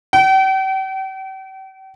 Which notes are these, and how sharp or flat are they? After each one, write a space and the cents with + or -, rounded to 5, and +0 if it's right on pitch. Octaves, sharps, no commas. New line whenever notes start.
G5 -40